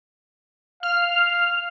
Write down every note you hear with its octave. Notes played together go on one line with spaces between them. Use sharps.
F5 F6